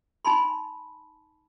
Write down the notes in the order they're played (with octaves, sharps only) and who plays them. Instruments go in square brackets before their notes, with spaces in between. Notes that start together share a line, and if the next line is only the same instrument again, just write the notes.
[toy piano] D#4 G#5 A5 B5 C6